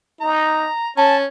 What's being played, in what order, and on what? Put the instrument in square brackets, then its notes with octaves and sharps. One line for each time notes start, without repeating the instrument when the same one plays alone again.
[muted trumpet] D#4 [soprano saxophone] A#5
[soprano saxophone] C#4 [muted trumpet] A5